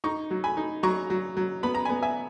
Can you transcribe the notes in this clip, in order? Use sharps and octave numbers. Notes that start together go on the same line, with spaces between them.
D#4 A#5 C#6
F#3
G#5 B5
D#4
F#3 A#5 C#6
F#3
F#3
B3 B5
A#5
B3 G#5 B5
E5 G#5